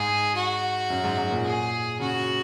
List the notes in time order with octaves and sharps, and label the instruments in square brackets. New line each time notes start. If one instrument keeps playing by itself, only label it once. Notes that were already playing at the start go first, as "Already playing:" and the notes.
Already playing: [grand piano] G#2 [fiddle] G#4
[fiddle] F#4
[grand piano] F#2
G#2
G#2
A#2
[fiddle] G#4
[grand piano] C#3 [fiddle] F#4